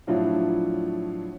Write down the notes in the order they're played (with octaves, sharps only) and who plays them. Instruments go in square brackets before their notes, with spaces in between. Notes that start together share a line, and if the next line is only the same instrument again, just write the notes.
[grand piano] A2 F3 F#3 D4 E4 F4